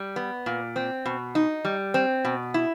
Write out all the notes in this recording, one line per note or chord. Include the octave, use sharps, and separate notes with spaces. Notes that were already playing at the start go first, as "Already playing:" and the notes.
Already playing: G3
B3
A#2
C4
B2
D#4
G3
C4
B2
E4